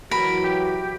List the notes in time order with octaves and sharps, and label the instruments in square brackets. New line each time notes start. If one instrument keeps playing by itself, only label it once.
[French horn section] E3 F#3 F#4 [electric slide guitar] A#4 [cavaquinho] B5
[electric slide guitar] G4